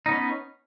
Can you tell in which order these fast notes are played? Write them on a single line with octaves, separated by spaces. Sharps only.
D#4 B3 C#4